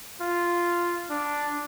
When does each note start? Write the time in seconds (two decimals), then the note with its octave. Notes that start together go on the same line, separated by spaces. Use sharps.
0.21 F4
1.10 D4